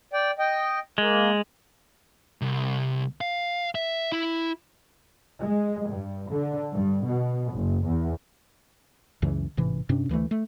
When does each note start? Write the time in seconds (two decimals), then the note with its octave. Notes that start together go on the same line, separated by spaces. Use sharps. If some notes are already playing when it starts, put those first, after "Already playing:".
0.13 D5 G5
0.39 D#5 G5
0.98 G#3 A#3
2.41 C2
3.21 F5
3.75 E5
4.12 E4
5.42 G#3
5.89 G2
6.31 D3
6.73 G2
7.05 B2
7.52 F#1
7.86 E2
9.22 C#2 F#2 C#3 E3
9.57 A1 G#2 C3 E3
9.89 G2 C3 C#4 D4
10.09 D2 E3 F3 A3
10.31 A3